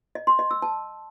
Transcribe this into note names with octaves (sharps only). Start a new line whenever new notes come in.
D#5
C6
D#5
E6
A5